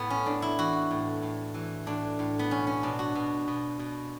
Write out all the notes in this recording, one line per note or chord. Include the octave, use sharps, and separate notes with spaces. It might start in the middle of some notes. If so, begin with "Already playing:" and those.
Already playing: A2 B3
C#4
A2 D4
E4
E3 F#4
A2
A2
E3
A2 D4
A2
B3
B2 C#4
C#4
B2 D4
F#4
B2
B2
B2